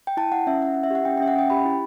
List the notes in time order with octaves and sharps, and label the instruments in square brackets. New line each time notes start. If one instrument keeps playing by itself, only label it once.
[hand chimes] G5
E4 A5
E4 F#5
C#4 E5
C#4 F#5
E4 F#5
E5
G4 F#5
C#4 G5
C#4 E5 G5
F#5
C#4 G5
G4 B5
E4